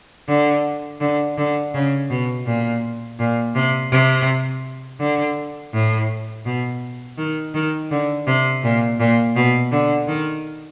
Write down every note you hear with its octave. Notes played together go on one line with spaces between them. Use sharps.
D3
D3
D3
C#3
B2
A#2
A#2
C3
C3
D3
A2
B2
D#3
D#3
D3
C3
A#2
A#2
B2
D3
D#3